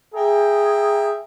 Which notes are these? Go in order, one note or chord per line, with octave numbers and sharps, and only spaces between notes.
G#4 E5 G5 A#5